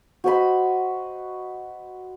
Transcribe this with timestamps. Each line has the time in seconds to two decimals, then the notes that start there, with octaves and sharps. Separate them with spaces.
0.24 F#4 C5 D#5 B5